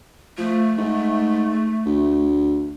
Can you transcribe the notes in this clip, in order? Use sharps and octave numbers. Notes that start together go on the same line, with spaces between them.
F3 A3
G#2
D2